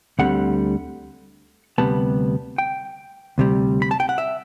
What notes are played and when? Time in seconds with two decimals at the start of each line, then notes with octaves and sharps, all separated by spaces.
0.19 D2 D3 G3 C4 F#5
1.78 D2 C3 G3 B3 A5
2.58 G5
3.38 D2 C3 G3
3.82 B5
3.91 A5
4.00 G5
4.09 F#5
4.18 E5